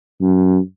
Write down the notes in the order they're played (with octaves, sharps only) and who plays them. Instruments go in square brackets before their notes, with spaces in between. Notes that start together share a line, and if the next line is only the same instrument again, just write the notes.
[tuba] F#2